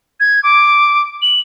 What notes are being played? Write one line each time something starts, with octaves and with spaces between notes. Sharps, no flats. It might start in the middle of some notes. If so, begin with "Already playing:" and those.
G#6
D6
F#7